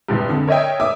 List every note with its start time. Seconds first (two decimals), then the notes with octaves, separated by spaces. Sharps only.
0.09 F1 A#1 G2
0.29 F2 D3
0.47 A#4 C#5 D#5 E5 G5
0.80 E5 D6 D#6